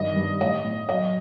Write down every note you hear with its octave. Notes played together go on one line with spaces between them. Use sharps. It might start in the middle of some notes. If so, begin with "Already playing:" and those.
Already playing: G2 D#3 D#5
G2
A2 D#5
A2
F#3 D#5